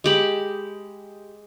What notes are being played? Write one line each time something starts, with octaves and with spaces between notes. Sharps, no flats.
G#3 G4 B5